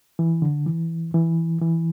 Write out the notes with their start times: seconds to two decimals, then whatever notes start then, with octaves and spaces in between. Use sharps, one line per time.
0.19 E3
0.42 D3
0.66 E3
1.14 E3
1.61 E3